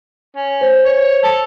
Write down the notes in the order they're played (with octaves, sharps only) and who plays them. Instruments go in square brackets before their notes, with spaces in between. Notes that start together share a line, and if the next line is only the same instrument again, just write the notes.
[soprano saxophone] C#4
[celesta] C5
[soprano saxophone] C#5
A4